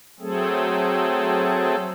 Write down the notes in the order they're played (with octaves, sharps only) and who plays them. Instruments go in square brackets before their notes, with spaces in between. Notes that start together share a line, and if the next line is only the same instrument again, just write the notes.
[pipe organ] F#3 A3 C4 G#4 A4